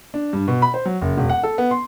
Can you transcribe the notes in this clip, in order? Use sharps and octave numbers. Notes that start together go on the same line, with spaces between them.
D4
G2
B2
B5
C5
F#3
F#1
E1
F#5
A4
B3
C6